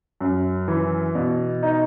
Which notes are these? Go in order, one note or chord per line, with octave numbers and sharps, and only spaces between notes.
F#2
E3
B2
D#4